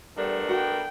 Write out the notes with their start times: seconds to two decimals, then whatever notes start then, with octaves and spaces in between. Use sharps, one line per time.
0.17 G3 A3 B3 D4 A#4
0.49 F#4 G5 B5